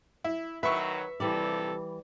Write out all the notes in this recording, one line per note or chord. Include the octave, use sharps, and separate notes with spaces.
E4
D#3 F#3 B4 E5 C#6
A#1 C3 E3 G3 A4 D5